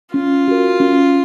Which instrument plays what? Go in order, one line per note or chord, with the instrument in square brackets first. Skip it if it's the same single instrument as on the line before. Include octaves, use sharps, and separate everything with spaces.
[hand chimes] C#4 [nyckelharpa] F4
[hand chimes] F#4 A#4
C#4